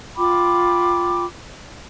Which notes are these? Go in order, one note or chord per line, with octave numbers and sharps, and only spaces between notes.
F4 G5 B5 D6